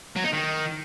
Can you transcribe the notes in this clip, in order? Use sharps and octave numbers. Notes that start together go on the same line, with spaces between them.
F#3
D#4
D#3